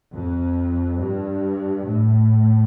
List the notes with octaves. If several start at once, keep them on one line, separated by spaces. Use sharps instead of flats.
F2
G2
A2